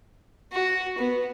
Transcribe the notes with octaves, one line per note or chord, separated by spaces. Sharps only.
F#4
B3